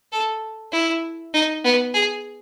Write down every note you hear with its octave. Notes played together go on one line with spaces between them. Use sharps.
A4
E4
D#4
B3
G#4